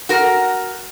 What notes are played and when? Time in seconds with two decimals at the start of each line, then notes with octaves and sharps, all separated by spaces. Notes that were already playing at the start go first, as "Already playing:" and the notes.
0.09 F#4 A#4